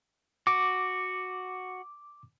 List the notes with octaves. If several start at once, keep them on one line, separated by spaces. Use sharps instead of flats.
F#4 D6